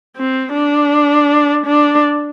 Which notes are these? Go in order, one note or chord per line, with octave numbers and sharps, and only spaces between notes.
C4
D4
D4